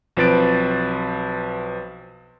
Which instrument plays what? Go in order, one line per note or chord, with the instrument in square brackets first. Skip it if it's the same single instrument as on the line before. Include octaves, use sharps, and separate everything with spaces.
[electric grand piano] B1 F3 C4 B4 A6 D7